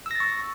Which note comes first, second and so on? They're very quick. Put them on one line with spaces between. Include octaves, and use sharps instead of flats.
E6 A#6 A6 C#6